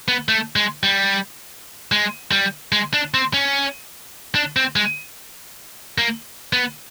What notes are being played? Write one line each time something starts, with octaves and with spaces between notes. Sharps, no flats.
B3
A3
G#3
G3
G#3
G3
G#3
D4
C4
C#4
D4
C4
G#3
A#3
B3